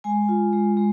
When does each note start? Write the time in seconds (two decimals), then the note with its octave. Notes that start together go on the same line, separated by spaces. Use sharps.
0.04 G#3 G#5
0.29 F4
0.53 G#3
0.77 G#3